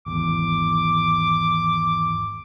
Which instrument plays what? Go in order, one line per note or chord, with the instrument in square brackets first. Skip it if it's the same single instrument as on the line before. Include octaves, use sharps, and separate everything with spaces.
[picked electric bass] G#1 E2 [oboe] D6